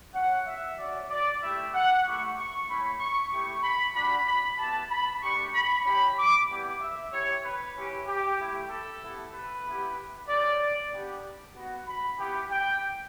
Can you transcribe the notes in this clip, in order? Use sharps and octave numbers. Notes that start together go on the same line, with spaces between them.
C#4 F#4 F#5
E5
C#4 F#4 D5
D5
A3 E4 G4 E5
F#5
A3 E4 G4 C#6
C#6
A3 C#4 E4 B5
C#6
A3 E4 G4 C#6
B5
G3 D4 F#4 B5
B5
B3 E4 G4 A5
B5
A3 D4 G4 C#6
B5
C#4 E4 G4 B5
D6
G3 B3 E4 G4
E5
C#4 E4 G4 C#5
B4
C#4 E4 G4
G4
A3 E4 G4
A4
B3 E4 G4
B4
B3 E4 G4
C#4 G4 D5
B3 D4 G4
B3 F#4
B5
B3 E4 G4
G5